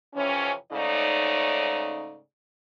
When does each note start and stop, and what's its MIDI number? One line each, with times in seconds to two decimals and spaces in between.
0.14 0.53 41
0.14 0.53 48
0.14 0.53 52
0.14 0.53 61
0.72 2.19 44
0.72 2.19 49
0.72 2.19 57
0.72 2.19 63
0.72 2.19 73
0.72 2.19 74